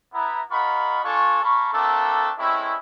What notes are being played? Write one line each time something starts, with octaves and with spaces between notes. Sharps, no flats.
B3 E4 A#5
F4 A#4 D#5 F#5 B5 C#6
D4 F4 A4 G#5 C#6
A#3 A5 B5 C#6
A3 A#3 C4 D4 A4
G#3 A3 C4 C#4 E4